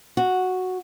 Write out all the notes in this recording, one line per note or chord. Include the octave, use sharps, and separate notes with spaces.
F#4